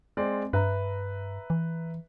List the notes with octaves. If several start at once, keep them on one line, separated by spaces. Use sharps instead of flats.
G#3 C4 D5
G2 B4 E5 A#5
E3